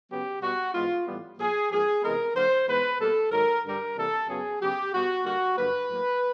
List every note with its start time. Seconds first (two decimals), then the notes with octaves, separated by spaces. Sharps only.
0.09 C#3 F#3 B3 G4
0.41 B2 G3 B3 F#4
0.73 G#2 E3 G#3 B3 F4
1.06 A2 E3 G3 B3
1.38 A#2 F3 A#3 G#4
1.70 G#2 F3 A#3 G#4
2.03 C3 E3 G#3 B3 A#4
2.34 D3 F#3 A#3 C5
2.67 G#2 E3 G#3 B3 B4
2.99 B2 G3 A#3 A4
3.31 G#2 D#3 F#3 A#4
3.64 G2 D3 G3 A#4
3.96 C3 E3 G3 A#3 A4
4.28 F#2 C#3 F#3 B3 G#4
4.60 C#3 F#3 B3 G4
4.92 B2 G3 B3 F#4
5.25 D3 G3 A#3 F#4
5.57 G2 D3 F#3 A#3 B4
5.89 A2 F#3 A#3